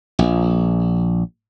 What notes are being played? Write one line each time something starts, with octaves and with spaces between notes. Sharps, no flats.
A#1